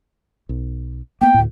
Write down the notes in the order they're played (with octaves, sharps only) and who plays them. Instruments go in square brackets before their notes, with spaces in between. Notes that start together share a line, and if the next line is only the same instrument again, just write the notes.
[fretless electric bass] B1
[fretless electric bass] A#3 B3 [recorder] G5
[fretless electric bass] D2 A2